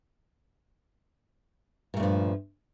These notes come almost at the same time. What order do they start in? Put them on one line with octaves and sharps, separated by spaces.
A#2 A3 G2 F3